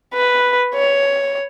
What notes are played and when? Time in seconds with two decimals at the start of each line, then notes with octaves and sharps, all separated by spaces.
0.14 B4
0.74 C#5